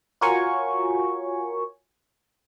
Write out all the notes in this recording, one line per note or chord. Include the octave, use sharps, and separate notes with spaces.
F4 F#4 A#4 C#5 G#5 C#6